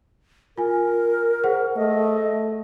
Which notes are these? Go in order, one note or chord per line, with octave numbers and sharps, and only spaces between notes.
F4 A#4 G#5
G#4 C5 F#5
A3 D#5